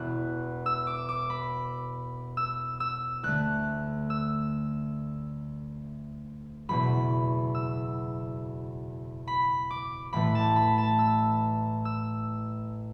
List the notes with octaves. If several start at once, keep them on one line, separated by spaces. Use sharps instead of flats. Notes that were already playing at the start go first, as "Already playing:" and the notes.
Already playing: E1 E2 B2 F#6
E6
D6
D6
B5
E6
E6
D2 D3 A3 F#6
E6
F#1 E2 B2 B5
E6
B5
D6
A1 A2 E3 A3 B5
A5
B5
A5
E6
E6